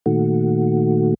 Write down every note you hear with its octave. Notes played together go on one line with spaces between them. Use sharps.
A#2 D#3 A3 F#4